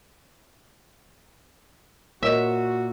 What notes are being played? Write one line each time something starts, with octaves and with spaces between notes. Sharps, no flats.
A#2 F#4 A#4 C#5 D#5 E5